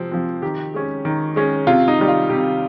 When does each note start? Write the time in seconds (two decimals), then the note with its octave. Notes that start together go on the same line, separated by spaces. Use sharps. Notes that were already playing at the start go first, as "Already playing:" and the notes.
Already playing: C3 F3 C4
0.11 F3 C4
0.42 D#3 G4
0.74 G#3 C#4
1.05 D#3
1.36 G#3 C#4
1.67 C3 F4
1.88 D#4
1.98 D#3 G3
2.08 F4
2.29 C3 G4